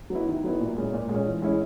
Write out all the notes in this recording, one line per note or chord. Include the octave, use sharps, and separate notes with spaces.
F#3 B3 E4
D#3
F#3 B3 E4
A#2
G#3 C#4
A#2
G#3
C#4
E3
G#3 C#4 E4